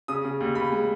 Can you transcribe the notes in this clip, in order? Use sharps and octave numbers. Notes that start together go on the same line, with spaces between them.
C#3 D#6
C#3
D#2
D#2 B5
G#3